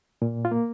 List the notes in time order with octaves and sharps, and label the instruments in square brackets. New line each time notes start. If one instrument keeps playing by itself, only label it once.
[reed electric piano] A#2
F4
A#3